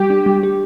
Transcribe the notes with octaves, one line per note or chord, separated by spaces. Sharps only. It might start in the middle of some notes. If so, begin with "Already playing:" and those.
Already playing: G3 G4
D4
G3
G4